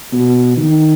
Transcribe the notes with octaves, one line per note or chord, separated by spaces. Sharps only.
B2
D#3